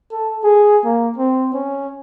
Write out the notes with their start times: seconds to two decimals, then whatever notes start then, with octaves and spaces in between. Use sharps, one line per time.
0.12 A4
0.44 G#4
0.85 A#3
1.18 C4
1.54 C#4